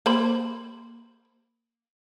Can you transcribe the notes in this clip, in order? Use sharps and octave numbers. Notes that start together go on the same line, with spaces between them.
A#3 C5 B5